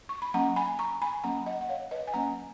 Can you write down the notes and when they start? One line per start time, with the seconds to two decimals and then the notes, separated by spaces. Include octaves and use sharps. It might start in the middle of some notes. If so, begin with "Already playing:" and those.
0.09 C#6
0.22 B5
0.34 F#3 A#3 C#4 F#5 A#5
0.56 G#5 B5
0.79 A#5 C#6
1.01 G#5 B5
1.24 F#3 A#3 C#4 F#5 A#5
1.46 D#5 F#5
1.61 F#5
1.69 C#5 F5
1.91 B4 D#5
2.07 G#5
2.13 F#3 A#3 C#4 F#5 A#5